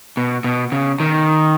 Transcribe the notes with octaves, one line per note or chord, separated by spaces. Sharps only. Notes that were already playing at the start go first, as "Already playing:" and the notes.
B2
B2
C#3
D#3